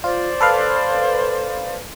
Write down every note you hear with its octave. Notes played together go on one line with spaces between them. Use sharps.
F4 C5 D5
A4 B4 F5